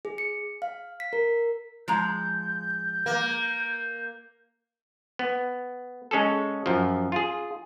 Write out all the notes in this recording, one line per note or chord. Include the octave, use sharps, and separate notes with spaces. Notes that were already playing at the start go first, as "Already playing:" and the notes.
G#4
C#7
F5
B6
A#4
F3 G#3 A#5 G6
A#3
B3
G#3 C#4 G#4 A4
F#2 F3
F4 G#4